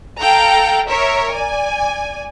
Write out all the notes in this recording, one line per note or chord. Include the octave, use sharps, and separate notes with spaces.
A4 F5 G5 A#5
A#4 C#5 E5
D5 G#5